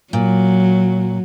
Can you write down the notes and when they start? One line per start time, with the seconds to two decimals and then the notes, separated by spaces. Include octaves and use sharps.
0.13 A#2 F#3